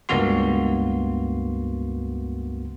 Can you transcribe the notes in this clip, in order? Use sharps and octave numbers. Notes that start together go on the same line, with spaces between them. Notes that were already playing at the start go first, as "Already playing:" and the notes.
C#2 G2 A#3 B3 F#4 C6